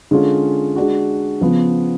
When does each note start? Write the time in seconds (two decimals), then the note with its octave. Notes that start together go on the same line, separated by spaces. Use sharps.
0.11 D3 G#3 C#4 F4
0.76 G#3 D4 F#4
1.41 C#3 F3 B3 F4